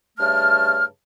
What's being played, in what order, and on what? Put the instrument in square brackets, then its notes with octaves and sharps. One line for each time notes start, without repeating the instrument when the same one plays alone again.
[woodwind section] G2 C#3 A3 A5 F6